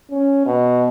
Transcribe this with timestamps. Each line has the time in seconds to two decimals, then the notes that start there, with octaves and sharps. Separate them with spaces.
0.11 C#4
0.46 B2